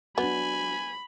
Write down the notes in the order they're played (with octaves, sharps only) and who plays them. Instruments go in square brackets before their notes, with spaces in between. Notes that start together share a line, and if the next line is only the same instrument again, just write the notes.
[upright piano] F#3 D4 [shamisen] B3 [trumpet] G#5 [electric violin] B5